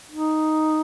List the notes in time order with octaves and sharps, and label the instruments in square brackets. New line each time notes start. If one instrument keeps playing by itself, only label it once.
[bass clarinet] D#4